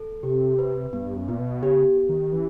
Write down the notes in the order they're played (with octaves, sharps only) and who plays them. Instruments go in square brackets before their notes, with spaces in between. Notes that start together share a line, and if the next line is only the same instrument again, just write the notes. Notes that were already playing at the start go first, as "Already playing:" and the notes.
Already playing: [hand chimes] A4
[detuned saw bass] C3 [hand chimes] G4
[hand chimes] B4
[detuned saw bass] G2 [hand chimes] B3
[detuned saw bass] F#2
[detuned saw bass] A#2 [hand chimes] B3
[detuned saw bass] B2
[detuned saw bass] C#3 [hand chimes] G4
[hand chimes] G4
[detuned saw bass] D#3
[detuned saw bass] E3 [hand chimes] C#4